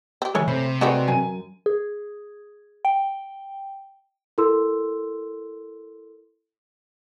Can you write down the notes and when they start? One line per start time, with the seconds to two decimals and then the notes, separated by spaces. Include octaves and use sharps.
0.22 C4 G4
0.35 C#3 E3 G#3 A3 A4 C#5 G#5
0.48 C3 C5 B5
0.81 F#3 G#3 A3 C4 F#4 B4 D5
1.08 F#2 G#5 D#7
1.66 G#4
2.85 G5
4.38 E4 A4 A#4 C6 E6